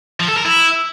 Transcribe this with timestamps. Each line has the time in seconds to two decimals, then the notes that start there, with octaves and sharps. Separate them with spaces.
0.20 F3
0.28 A4
0.37 A#4
0.45 E4